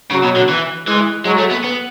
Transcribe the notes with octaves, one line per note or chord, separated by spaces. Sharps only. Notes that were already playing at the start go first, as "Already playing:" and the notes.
C#3 F#3
B2
D3
E3
E3 G#3
F#3 G#3
A3
B3
B3